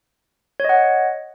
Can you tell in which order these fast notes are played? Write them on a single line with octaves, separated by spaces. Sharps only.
C#5 D#5 F#5